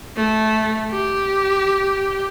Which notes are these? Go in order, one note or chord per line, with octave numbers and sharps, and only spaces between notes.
A3
G4